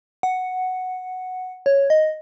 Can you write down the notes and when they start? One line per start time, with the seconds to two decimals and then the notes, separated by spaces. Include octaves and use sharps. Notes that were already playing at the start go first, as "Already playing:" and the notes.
0.23 F#5
1.66 C#5
1.90 D#5